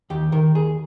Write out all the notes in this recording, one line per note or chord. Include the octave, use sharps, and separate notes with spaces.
D#2 G4
D#3 A#4
D#2 G#4